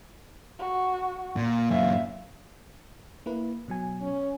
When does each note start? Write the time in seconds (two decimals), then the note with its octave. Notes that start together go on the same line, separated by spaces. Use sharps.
0.59 F#4
1.36 A#2
1.70 F#2 A#2 E5 F5
3.26 A#3 E4 B4
3.68 B2 F#3 G#5
4.02 C#4